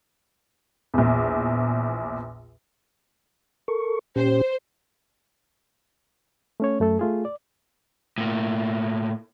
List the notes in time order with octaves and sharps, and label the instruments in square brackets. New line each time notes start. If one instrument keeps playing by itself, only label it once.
[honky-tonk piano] A#1 E2
[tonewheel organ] A4 A#4 C#6
[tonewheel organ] A#2 C#4 G4 [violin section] C5
[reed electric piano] A3 C#4 C#5
F#2 A3 A4
A3 F4 G#4
D5
[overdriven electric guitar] A2 A#3